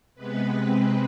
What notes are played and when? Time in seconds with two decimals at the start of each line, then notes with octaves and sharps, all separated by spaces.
0.15 C3 G#3 B3 B4
0.54 C3 G#3 C4